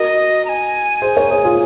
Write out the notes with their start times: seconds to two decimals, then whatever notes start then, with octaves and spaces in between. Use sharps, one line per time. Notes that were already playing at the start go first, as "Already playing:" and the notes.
Already playing: F#4 A#4 D#5
0.45 A#5
0.49 G#5
1.02 G#4 C5
1.16 A#4 C#5
1.30 G#4 C5
1.44 F4 G#4